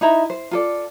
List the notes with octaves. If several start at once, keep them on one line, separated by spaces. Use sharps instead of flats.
D#4 E4 A#5
C5
F4 A4 D5